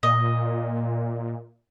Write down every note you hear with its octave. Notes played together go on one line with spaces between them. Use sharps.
A#2 D#5